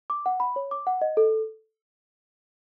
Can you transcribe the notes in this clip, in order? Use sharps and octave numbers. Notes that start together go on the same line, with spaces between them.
D6
F#5
B5
C#5
D6
F#5
D#5
A4